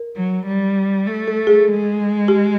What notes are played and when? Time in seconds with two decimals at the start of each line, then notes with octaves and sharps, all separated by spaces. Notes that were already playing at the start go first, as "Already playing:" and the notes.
Already playing: A#4
0.16 F#3
0.47 G3
1.06 A3
1.28 A4
1.47 G#4
1.68 G#3
2.28 G4